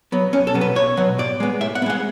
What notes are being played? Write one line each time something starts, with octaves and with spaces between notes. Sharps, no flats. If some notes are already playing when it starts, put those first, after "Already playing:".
F#3 B3
B1 C#4
A4
B2 F#3 B3
B4
B1 C#5
B2 F#3 B3
A2 D5
G#3 B3
A2 E5
F#5
B3
G#3 F#5